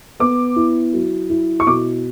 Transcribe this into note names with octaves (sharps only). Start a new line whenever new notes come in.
B3 D6
E4
F#3
E4
C#6
B2 D6